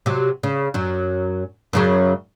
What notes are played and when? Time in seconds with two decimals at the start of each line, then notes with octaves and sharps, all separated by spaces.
0.06 C3 F#3
0.43 C#3
0.74 F#2 F#3
1.73 F#2 C#3 F#3